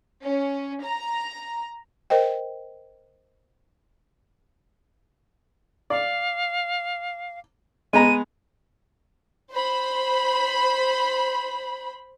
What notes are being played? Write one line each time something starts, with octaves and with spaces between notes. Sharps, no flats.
C#4
A#5
A#4 C5 D#5 G5
D5 F5
G#3 B3 A#5 D#7
C5 B5